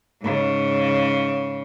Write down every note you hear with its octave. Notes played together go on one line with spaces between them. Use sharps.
G#2 C#3